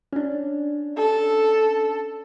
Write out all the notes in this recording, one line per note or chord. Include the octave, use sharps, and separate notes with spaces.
C#4 D4
A4